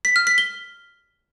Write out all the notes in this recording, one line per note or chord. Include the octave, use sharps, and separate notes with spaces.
B6
F6
B6
G7